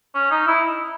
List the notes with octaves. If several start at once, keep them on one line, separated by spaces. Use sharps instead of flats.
C#4
D#4
E4